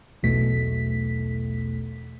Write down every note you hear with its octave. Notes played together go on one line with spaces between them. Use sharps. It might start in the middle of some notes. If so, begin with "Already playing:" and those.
B1 E2 B2 A3 B6